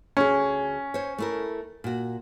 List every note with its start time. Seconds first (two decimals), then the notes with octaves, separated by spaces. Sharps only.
0.17 D2 C#4 G#4
0.94 C5 C#5
1.18 A3 E4 A#4
1.84 A#2 F#4